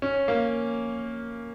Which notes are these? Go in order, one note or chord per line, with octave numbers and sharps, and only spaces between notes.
C#4
A#3